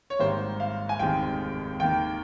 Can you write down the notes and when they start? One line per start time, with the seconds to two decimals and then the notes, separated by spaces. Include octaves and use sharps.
0.10 C#5
0.19 G#1 G#2 D#3 G3 A#3 C5
0.60 F5
0.89 G#5
0.99 F1 D#2 D#3 G#3 C4 G5
1.79 D#2 D#3 A#3 G5